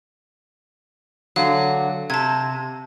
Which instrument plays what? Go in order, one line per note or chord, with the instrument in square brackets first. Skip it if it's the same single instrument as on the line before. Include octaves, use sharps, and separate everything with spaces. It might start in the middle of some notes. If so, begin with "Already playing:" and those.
[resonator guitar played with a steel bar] D3 F#3 [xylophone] F5
[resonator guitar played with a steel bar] C3 [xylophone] A5 G#6